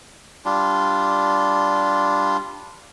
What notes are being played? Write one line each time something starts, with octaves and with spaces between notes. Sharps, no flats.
G3 D4 F4